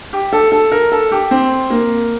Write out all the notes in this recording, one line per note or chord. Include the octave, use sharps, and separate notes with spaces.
G4
A4
A4
A#4
A4
G4
C4
A#3